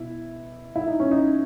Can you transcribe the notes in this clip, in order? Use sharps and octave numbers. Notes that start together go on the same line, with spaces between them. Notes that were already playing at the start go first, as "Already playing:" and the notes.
Already playing: B2 E4
E4
D#4
C#4
D#4